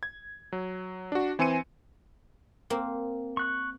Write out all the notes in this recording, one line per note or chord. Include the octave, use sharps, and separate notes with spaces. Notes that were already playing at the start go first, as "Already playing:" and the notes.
G#6
F#3
D4 F#4
E3 C4 G#5 C6 C#7 D#7
A#3 C4
C#6 F#6